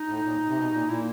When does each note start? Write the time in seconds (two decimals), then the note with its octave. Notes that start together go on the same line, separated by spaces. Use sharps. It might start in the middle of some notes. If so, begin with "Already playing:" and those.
Already playing: D#4
0.09 A2
0.25 A#2
0.48 C3
0.58 B2
0.73 A#2
0.89 A#2 E4